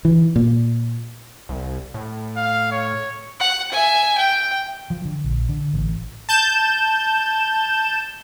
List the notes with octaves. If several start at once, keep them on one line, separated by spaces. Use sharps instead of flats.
E3
A#2
C2
A2
F5
C#5
F#5
E5 G#5
G5
F3
D3
A#1
D3
A1
A5 G6 E7